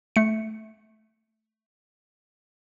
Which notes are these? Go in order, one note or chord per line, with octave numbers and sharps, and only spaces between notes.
A3 C#7